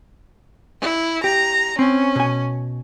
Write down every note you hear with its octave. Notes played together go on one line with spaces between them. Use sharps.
E4
G4 A#5
C4 C#4
B2 G#5